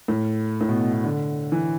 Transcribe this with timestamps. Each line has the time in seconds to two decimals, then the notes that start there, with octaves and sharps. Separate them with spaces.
0.08 A2
0.61 A2
0.68 B2
0.81 B2
0.93 B2
1.04 D3
1.52 E3